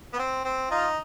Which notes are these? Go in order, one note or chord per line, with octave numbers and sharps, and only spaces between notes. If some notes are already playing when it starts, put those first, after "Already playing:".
B3
C4
C4
D#4 F4